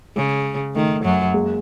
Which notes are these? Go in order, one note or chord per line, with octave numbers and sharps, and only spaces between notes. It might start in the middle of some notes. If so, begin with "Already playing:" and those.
C#3 G#3
D#3 A3
F#2 F#3
G#3 A#3